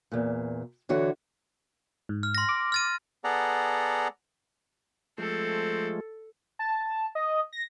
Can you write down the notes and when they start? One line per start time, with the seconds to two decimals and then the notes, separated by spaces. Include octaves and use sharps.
0.12 E2 A#2
0.89 D3 E3 F#4 C#5
2.09 G#2
2.23 F6
2.35 C6 A#6
2.49 D6
2.72 F6 A6 D#7
3.24 B3 G#4 A4 D5 F#5 A#5
5.18 F3 G#3 A3 C4 A4
6.59 A5
7.15 D#5
7.53 A#6